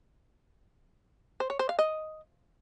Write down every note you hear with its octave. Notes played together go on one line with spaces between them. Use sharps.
C5
C#5
C5
F5
D#5